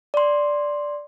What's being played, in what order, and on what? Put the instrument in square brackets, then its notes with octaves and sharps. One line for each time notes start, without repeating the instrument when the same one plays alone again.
[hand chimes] D5 C6